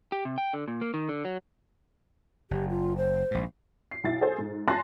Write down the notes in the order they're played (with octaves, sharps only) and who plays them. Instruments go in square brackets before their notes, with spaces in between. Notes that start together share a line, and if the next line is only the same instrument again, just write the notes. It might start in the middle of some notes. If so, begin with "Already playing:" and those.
[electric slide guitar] G4
C3
G5
D3
A#2
A#3
D#3
D3
F#3
[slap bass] F#1 [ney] G4
[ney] F4
C5
[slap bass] A#1 G#2
[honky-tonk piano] C7
B1 E4 A6
G#4 A4 C5
G#2
G#5 A5 C6 F#6 A6 A#6